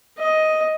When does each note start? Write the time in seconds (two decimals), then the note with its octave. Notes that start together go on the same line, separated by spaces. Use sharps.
0.19 D#5